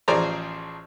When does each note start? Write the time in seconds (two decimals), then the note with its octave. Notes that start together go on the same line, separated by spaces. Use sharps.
0.08 A1 F3 G#4 C5 D5 A#5